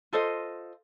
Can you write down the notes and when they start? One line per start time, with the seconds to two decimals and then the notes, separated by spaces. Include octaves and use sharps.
0.13 F4 A4 C5 D#5